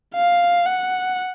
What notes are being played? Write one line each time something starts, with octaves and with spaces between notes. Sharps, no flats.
F5
F#5